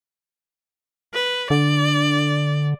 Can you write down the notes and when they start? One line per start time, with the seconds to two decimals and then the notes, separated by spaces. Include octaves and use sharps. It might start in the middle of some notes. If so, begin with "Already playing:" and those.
1.14 B4
1.50 D3 D5